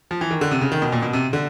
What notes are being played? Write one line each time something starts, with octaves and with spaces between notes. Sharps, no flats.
F3
E3
D#3
D3
C3
C#3
D#3
B2
A#2
B2
C3
D3